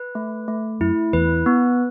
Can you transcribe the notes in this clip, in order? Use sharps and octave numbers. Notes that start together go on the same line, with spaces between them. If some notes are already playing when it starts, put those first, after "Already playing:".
Already playing: B4
A3
A3
F#2 E4
E2 B4
B3